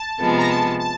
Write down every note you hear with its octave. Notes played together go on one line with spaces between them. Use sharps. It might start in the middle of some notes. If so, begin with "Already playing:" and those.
Already playing: A5
C3 F3 G#3 B3
A#5
A5
A5